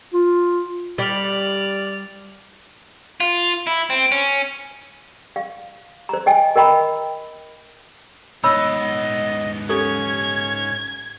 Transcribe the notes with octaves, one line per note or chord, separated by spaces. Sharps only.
F4
G3 D5 F6
F4
E4
C4
C#4
F5
C5 A#5
D#5 G5 G#5
A#4 D#5 G5 A#5 B5
G#2 B3 C#5 D#5 B5 E6
C#4 G4 A4 G#6